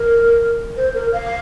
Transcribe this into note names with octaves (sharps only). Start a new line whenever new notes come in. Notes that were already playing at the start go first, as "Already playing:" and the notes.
Already playing: A#4
C5
A#4
F5